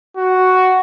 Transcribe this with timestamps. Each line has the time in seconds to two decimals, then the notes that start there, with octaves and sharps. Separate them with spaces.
0.17 F#4